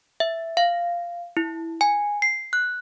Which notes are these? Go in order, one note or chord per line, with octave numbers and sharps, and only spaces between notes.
E5
F5
E4
G#5
C7
F#6